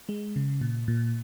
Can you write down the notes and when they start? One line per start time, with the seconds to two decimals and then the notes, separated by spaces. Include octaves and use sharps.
0.09 G#3
0.36 C#3
0.61 A#2
0.88 A#2